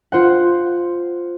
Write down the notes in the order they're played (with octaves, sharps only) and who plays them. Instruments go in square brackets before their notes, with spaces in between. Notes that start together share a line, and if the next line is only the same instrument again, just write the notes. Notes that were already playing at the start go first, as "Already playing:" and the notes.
[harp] F4 C5 F#5